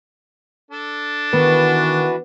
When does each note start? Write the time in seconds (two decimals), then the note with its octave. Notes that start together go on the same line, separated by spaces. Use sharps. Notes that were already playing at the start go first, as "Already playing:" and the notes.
0.71 D4 A4
1.33 D#3 E3 B3 F#4 B4